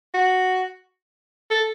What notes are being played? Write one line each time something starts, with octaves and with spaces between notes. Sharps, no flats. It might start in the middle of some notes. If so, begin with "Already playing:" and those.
F#4
A4